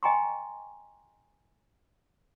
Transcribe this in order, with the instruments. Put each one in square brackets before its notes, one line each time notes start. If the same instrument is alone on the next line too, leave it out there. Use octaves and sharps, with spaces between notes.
[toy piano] D#5 G5 G#5 A#5 C6 C#6